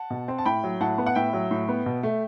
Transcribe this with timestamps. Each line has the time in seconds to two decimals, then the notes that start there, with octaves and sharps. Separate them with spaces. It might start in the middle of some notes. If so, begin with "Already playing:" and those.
Already playing: F#5 A5
0.10 B2
0.28 C4
0.38 A5
0.45 A2 G5 B5
0.64 F#3
0.81 A2 F#5 A5
0.98 B3
1.06 F#5
1.15 A2 E5 G5
1.33 F#3
1.51 A2
1.69 B3
1.86 B2
2.03 A3